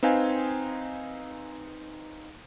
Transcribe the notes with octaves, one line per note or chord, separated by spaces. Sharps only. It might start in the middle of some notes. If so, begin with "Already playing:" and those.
C4 D#4 B4 F5 G#5